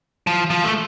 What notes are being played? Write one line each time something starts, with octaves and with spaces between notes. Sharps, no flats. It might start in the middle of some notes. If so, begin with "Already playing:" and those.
F3
F3
A3